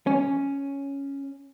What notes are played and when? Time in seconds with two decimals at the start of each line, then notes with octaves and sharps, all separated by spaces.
0.07 C#4